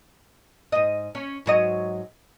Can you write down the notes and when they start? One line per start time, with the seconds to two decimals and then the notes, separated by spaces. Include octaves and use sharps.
0.72 G#2 D#5
1.15 C#4
1.46 G#2 F#3 D#5